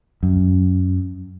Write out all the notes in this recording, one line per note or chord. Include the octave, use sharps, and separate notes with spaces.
F#2